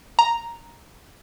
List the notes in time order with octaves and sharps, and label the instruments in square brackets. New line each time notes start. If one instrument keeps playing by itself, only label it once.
[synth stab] A#5